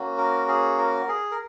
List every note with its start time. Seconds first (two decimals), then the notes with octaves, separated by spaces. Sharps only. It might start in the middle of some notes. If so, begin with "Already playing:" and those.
Already playing: A#3 C#4 F#4
0.18 A#4
0.48 G#4
0.78 A#4
1.08 G#4
1.31 A#4